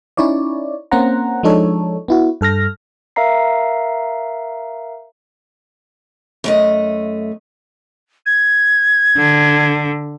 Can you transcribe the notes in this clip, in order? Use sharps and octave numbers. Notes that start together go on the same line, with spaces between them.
C#4 D#4 E4 C#5 D5
A#3 C4 C#4 C5 F#5 A#5
F3 G#3 D4 D#4 A4 C#5
B3 E4 F#4
G2 A4 F6 A#6
A#4 E5 F5 A#5 C7
F#2 A3 D#5
G#6
D3